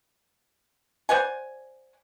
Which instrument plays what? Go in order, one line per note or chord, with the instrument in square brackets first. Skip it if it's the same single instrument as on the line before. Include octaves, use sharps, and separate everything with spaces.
[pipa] C5 D5 F#5 G#5